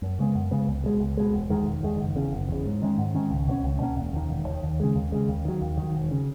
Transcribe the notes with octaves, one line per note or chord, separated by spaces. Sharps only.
F#2
C#3 G#3 B3
F#2
C#3 G#3 B3
C#2
B2 G#3
C#2
B2 G#3
E1
E2 D#3 G#3
E1
E2 D#3 G#3
F#1
E2 C#3
F#1
E2 C#3
G#2
D#3 G#3 C#4
G#2
D#3 G#3 C#4
C#2
B2 A#3 C#4
C#2
B2 A#3 C#4
E1
D#2 D#3
E1
D#2 D#3
D#2
C#3 G#3
D#2
C#3 G#3
D#2
D#3 F#3
D#2
D#3 F#3
E1
C#3